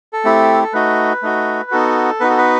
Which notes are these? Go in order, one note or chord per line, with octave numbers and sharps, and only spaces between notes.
A4
A3 C4 E4 G4
A4
A3 D#4 F#4 B4
A3 D#4 F#4
B3 D#4 F#4 A4
B3 D#4 F#4 B4
A4
B4